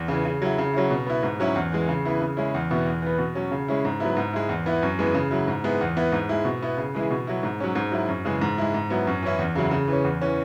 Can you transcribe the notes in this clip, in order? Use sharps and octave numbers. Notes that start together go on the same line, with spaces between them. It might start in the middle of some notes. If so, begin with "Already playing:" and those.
Already playing: E2
C#3 E3
C#3
F#3 E4
C#3
F#3 C#4 E4
B2
B3 E4
G#2
F#3 C#4 E4
E2
E3 G#3
C#3
E3 B3 E4
C#3
G#3 C#4 E4
E2
B2 B3 E4
E2
E3 B3
B2
F#3 C#4
C#3
G#3 C#4 E4
G#2
F#3 B3 E4
G#2
G#3 E4
E2
E3 B3 E4
F#2
E3 G#3 B3
C#3
F#3 E4
G#2
G#3 B3 E4
E2
E3 B3 E4
G#2
G#3 E4
B2
B3 E4
C#3
E3 G#3 E4
B2
F#3 E4
G#2
F#3 C#4
G#2
F#3 E4
F#2
C#3 E3 G#3
G#2
G#3 E4
G#2
F#3 B3 E4
F#2
E3 C#4 E4
E2
C#3 F#3 E4
C#3
E3 C#4
E2
E3 C#4